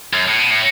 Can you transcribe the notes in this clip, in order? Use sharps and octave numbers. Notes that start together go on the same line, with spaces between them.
F#2
A2
B2
A2